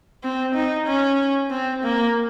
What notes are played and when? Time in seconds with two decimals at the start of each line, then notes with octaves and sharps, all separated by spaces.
0.23 C4
0.54 D#4
0.86 C#4
1.51 C4
1.84 A#3